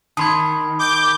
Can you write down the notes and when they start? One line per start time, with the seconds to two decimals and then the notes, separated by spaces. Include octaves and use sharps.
0.17 D#3 A5 B5 C6 D#6 G#6
0.79 D6 G6